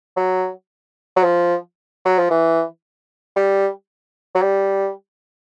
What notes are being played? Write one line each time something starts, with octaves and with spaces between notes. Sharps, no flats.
F#3
F#3
F3
F#3
F3
E3
G3
F#3
G3